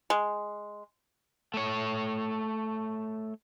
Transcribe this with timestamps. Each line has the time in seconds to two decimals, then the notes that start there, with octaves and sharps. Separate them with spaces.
0.10 G#3
1.54 A3 C#5